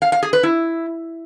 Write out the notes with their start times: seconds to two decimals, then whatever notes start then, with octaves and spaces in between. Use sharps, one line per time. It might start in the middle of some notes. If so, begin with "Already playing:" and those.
0.02 F5
0.12 F5
0.23 G#4
0.33 B4
0.43 E4